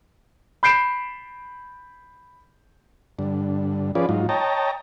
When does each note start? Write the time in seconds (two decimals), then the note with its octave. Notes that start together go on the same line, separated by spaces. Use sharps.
0.63 B5 G6 C7 D7 E7
3.19 G2 D3
3.95 F3 C#4 F4 G#4 B4 D5
4.09 G#2 F#3 D#4 F4
4.29 C#5 D#5 G5 A5 A#5